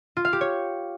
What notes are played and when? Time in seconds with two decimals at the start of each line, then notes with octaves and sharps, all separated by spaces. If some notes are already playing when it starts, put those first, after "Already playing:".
0.17 F4
0.25 F5
0.33 G4
0.41 C#5